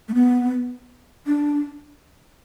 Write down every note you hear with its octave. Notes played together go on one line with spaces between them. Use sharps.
A3
B3
D4